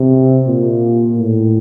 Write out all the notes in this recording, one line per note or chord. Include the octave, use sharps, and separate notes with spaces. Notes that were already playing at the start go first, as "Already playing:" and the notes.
Already playing: C3
A#2
A2